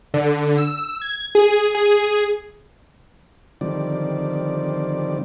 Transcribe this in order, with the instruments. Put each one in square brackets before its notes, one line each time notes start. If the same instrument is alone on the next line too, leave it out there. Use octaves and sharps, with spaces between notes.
[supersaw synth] D3
E6
G#6
G#4
G#4
[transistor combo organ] D3 D#3 F3 G3 C4 D5